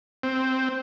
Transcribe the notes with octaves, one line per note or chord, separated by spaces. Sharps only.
C4